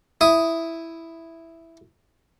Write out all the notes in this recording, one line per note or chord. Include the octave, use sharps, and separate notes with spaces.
E4 D#6